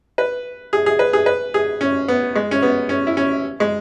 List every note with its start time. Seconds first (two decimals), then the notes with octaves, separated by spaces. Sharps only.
0.18 B4
0.73 G#4
0.86 G#4
0.99 B4
1.13 G#4
1.26 B4
1.54 G#4
1.81 C#4
2.08 B3
2.36 G#3
2.51 C#4
2.62 B3
2.89 C#4
3.07 E4
3.17 C#4
3.60 G#3